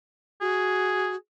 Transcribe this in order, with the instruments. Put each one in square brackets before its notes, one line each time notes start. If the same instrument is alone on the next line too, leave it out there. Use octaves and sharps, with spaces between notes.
[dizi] F#4 [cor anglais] G#4